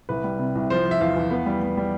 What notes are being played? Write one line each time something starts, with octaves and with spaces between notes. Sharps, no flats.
C2 B4
G3
C3
C2
F3 C5
F3
E5
E2 F5
E2
B3
G3
G3
G3